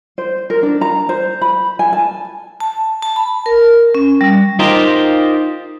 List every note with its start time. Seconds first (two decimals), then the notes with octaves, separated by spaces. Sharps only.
0.18 C5
0.50 A#4
0.63 D4
0.81 A#5
1.09 C5
1.41 B5
1.79 G#5
1.93 A5
2.60 A5
3.03 A5
3.16 B5
3.46 A#4
3.95 C#4
4.21 G3
4.59 D#4 F4 G4 A#4 C5